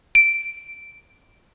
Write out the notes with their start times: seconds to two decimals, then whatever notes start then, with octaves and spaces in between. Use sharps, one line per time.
0.15 D7